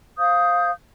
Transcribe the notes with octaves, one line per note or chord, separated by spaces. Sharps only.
C5 F5 D#6 G6